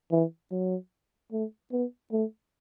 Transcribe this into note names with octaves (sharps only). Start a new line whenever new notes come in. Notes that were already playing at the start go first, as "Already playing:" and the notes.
E3
F#3
A3
B3
A3